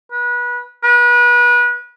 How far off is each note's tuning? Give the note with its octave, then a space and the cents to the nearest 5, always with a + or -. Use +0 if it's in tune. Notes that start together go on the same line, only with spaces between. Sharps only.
B4 -25
B4 -30